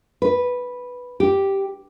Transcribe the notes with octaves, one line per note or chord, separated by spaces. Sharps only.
B4
G4